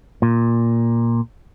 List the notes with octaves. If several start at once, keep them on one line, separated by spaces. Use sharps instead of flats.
A#2